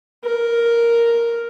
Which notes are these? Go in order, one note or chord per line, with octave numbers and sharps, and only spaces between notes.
A#4